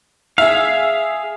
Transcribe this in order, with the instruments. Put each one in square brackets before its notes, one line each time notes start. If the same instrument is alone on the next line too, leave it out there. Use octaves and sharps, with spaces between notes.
[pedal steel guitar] G#4 F5 [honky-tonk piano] E5